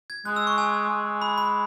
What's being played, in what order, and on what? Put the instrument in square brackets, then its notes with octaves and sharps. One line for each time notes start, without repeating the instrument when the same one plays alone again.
[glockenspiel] G#6
[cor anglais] G#3 [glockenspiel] F#6
[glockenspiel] E6
C#6
G#5
[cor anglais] G#3
G#3
[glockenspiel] B5
B5